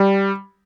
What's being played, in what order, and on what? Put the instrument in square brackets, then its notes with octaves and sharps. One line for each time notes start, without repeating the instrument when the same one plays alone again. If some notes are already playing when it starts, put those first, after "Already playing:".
Already playing: [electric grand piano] G3